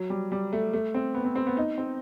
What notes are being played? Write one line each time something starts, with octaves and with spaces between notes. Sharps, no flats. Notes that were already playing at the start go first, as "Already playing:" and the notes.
Already playing: F#3
G3
G3
A3
A3
C4
B3
C4
C4
B3
D#4
C4